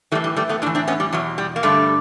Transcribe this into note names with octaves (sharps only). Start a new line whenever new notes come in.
A2 E3 G3 A3
G3
G3 A3
A3 B3
A2 E3 D4 E4
C4 D4
B3 C#4
G3
E2 B2 F#3
G3
A#3
G2 D3 G3 A3